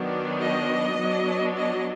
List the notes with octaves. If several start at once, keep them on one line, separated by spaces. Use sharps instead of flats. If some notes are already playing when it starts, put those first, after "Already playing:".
Already playing: D#3 F#3 B3 D4
D#5
F#3 B3 D4
D#5